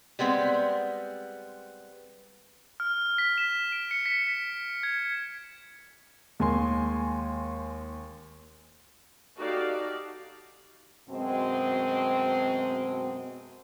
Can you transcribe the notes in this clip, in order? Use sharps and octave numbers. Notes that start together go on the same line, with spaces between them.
G3 G#3 B3 C4
F6
B6
E7
D7
C#7
B6
G#6
D#2 G#3 G#5 C6
D#4 F#4 G4 A4 D5 F5
F#2 B2 G#3 C4